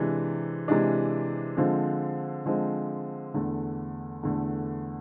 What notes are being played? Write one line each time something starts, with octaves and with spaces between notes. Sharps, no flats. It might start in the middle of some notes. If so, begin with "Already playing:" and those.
Already playing: C3 E3 G#3 D4
C3 E3 G#3 D4
D3 F3 G#3 C4
D3 F3 G#3 C4
E2 D3 A3
E2 D3 A3